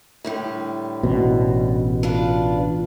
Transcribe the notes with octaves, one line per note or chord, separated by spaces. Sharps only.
A2 D3 G3
A1 B2
D4 F4 B4